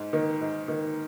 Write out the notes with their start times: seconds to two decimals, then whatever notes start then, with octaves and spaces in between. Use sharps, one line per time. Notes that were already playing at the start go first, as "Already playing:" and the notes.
Already playing: G#2
0.13 D#3 A#3
0.41 G#2
0.68 D#3 A#3